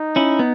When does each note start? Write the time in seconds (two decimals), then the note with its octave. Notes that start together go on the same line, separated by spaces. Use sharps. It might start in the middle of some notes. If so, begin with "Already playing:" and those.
Already playing: D#4
0.16 C#4 E4
0.39 B3